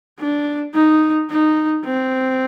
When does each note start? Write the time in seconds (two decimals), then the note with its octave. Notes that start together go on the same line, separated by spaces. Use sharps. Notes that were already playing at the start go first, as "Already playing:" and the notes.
0.19 D4
0.74 D#4
1.30 D#4
1.85 C4